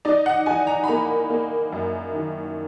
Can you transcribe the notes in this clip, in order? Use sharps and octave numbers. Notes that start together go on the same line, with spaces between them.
D#4 D5
F#5
D#4 G#5
A#5
B5
A#3 A#5
A#3
F#2
D#3